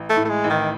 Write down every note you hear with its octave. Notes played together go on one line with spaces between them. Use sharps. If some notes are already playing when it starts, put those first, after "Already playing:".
Already playing: A1
A3
A2
A3
G#3
A1
D#3